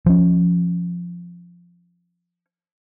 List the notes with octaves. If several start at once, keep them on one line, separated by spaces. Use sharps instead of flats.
F3 C#4